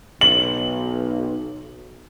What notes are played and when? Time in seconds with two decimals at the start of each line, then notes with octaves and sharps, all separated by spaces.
0.21 B1 F#7